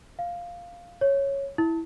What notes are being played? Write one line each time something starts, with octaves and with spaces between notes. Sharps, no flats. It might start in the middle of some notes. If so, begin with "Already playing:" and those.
F5
C#5
E4